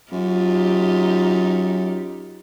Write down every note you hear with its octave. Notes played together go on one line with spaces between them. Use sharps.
F#2 D#4 F4 G4